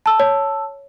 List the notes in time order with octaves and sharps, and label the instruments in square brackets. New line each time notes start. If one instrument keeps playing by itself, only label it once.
[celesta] A5 E6
[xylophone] C#5